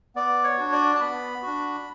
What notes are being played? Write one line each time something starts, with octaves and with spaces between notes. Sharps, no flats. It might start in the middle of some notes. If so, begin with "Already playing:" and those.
B3 D5
C#5
D4 F#4
D5
A5
B3 B5
D4 F#4